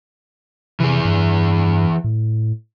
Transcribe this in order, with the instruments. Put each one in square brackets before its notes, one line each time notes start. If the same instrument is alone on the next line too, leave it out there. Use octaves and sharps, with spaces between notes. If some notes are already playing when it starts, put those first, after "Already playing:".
[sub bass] C3 [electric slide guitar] E3 G#4
[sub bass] G2
A2